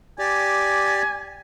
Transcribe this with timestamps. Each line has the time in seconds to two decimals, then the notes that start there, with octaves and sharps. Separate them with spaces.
0.19 G4 D5 G#5